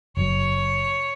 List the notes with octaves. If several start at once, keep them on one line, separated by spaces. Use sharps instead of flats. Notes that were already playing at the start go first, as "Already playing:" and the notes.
F#1 F#3 C#5